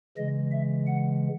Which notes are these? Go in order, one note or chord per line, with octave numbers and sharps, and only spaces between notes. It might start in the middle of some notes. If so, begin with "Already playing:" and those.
C#3 E3 G#3 D#5
E5
F#5